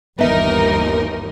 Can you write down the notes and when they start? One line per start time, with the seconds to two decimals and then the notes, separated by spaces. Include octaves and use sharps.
0.19 G1 D#2 E3 B3 D#4 A#4 E5